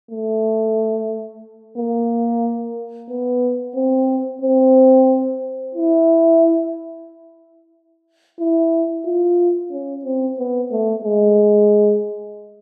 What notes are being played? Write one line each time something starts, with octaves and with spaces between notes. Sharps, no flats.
A3
A#3
B3
C4
C4
E4
E4
F4
C#4
C4
B3
A3
G#3